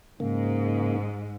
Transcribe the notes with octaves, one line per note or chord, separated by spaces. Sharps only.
G#2 C#3 A#3